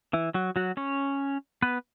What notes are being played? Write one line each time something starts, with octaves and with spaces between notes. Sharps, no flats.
E3 E4
F#3 F#4
F#3 F#4
C#4 C#5
B3 B4